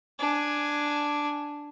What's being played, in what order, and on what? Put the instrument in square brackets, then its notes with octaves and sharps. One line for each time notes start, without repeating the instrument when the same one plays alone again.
[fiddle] D4 G#5